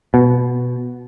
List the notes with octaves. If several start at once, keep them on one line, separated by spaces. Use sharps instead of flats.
B2